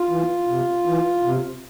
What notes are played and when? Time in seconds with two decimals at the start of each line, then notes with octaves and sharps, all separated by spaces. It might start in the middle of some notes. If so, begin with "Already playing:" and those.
Already playing: F4
0.09 E3
0.47 C3
0.86 E3
1.23 C3